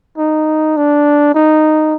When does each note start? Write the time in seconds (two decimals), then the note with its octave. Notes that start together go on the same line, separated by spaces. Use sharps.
0.18 D#4
0.77 D4
1.35 D#4